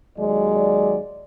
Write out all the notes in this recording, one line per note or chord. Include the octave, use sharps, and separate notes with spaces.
D#2 F#3 G#3 D5